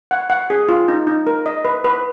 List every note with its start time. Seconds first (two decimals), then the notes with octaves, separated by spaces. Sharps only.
0.11 F#5
0.30 F#5
0.50 G#4
0.69 F4
0.88 D#4
1.07 D#4
1.27 A#4
1.46 D#5
1.65 B4
1.84 B4